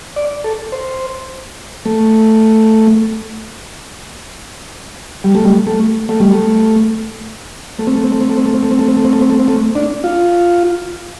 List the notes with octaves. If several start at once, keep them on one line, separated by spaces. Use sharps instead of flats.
D5
A4
C5
A3
G3
A3
G3
A3
A3
G3
A3
A3
C4
A3
C4
A3
C4
A3
C4
A3
C4
A3
C4
A3
C4
A3
C4
A3
C4
A3
C4
A3
D4
F4